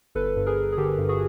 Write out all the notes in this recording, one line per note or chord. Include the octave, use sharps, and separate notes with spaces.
G1 A4 B4
G2
G#4 A#4
G1
G#4
D3 G4 A4
G2
F#4 G#4